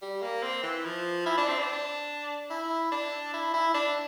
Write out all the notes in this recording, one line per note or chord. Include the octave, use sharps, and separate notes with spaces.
G3
A#3
C4
E3
F3
E4
D4
C4
D4
E4
D4
E4
E4
D4